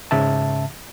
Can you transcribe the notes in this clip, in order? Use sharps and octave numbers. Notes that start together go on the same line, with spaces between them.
G#2 C#3 E5 A5